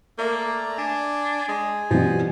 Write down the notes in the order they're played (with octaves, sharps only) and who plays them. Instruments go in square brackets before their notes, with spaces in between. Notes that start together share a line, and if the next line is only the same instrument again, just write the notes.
[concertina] A3 D5 A#5 [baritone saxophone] A#3
[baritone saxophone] D4 [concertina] G#5
[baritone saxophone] G#3
[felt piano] B2 E3 G3 [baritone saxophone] F3